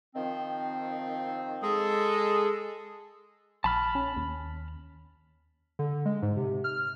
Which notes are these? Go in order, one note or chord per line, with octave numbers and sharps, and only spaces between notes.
D#3 F3 C4
G#3 G#4 A4
A#1 A5 B5 F6
C#4
D#2
D3
G#3
G#2
C3
F6